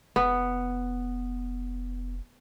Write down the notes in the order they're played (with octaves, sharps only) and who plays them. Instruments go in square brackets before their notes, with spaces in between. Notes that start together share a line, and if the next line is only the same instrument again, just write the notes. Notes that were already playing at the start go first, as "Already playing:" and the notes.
[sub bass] F1 [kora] B3